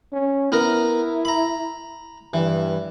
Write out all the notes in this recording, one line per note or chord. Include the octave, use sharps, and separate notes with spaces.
C#4
B3 E4 A#4 A#5
A#5 B5
G2 E3